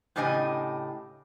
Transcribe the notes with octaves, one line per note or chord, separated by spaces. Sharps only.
A2 C#3 D4 G4 D#5 G#5